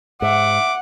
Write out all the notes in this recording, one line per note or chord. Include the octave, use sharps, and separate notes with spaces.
G#2 E5 F#5 D6